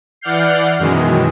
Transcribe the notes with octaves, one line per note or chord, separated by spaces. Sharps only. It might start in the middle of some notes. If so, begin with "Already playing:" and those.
E3 D5 F#5 F6 G6 C7
F#2 B2 D#3 E3 G#3